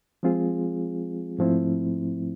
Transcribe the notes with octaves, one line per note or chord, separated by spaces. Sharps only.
F3 G#3 C4 F4 G#4
G#2 F3 A3 C4 E4